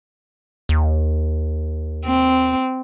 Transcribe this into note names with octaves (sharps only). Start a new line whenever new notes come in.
D#2
C4